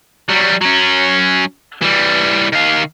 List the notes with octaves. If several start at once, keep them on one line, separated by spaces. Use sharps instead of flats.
F#3 G3
F#3 C#4
E3 G3
D#3 F5